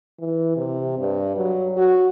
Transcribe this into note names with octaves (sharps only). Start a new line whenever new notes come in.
E3
C3
G2
F#3
F#4